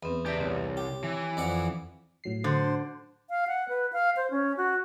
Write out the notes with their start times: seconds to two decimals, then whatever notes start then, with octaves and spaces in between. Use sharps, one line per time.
0.03 E2 B3 C4
0.26 G4 D5 E5 A5
0.40 C2 C4 C#5
0.77 G4
1.04 E3
1.37 F2 D5 F#5
2.24 A2 F#3 C7
2.44 D3 C5
3.29 F5
3.48 F#5
3.69 B4
3.93 F5
4.16 C5
4.31 C#4
4.57 F#4